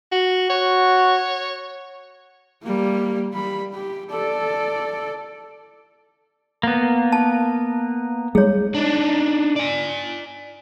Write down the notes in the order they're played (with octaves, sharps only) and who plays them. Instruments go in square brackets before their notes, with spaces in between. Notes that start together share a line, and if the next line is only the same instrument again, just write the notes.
[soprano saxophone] F#4
[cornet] F#4 [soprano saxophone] C#5
[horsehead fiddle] G3 A#3
G3 B5
G4
A4 D5
[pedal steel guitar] A#3 B3
[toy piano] A5
[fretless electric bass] G3 G#3 [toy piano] G#4 C#5
[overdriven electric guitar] D4 D#4
D5 G#5